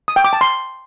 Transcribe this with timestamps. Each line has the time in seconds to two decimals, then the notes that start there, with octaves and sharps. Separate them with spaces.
0.08 D#6
0.16 G5
0.25 D6
0.33 A5
0.41 C6